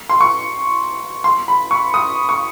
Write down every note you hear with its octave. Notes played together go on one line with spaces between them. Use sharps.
C6
C#6
C6
B5
C#6
D#6
C#6